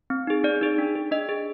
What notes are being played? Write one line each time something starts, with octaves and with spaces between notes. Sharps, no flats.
C4
D#4 G#4
C4 D5
D#4 G#4
D4
G#4
D4 D#5
G#4